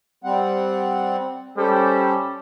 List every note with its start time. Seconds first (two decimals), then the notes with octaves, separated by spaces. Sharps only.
0.24 G3 C4 F#5
1.57 G3 C#4 A4 C5